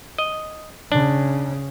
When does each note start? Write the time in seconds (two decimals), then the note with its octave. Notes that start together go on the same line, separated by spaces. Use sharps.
0.19 D#5
0.92 C#3 D4